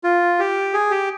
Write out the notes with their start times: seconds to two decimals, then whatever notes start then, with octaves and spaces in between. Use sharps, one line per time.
0.04 F4
0.39 G4
0.74 G#4
0.91 G4